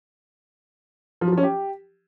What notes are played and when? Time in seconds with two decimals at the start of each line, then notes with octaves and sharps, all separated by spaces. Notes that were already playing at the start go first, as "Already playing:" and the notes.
1.21 F3
1.27 F#3
1.32 F3
1.38 C#4
1.43 G4